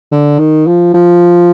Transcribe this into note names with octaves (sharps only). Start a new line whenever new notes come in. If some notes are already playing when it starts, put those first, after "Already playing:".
D3
D#3
F3
F3